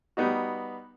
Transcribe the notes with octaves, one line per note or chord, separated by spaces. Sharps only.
G3 B3 D#4 F#4